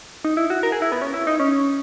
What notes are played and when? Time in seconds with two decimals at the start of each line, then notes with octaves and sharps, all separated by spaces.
0.25 D#4
0.37 E4
0.50 F#4
0.63 A#4
0.72 G#4
0.82 E4
0.92 B3
1.02 C#4
1.14 E4
1.27 D#4
1.40 C#4